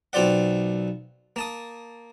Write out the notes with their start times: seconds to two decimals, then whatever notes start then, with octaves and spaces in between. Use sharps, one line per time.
0.13 B1 C4 F4 D5 F#5
1.36 A#3 A5 D#6